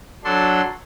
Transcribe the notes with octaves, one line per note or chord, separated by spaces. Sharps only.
F#3 D4 A4 C6